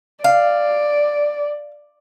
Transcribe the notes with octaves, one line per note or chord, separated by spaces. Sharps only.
D5 F5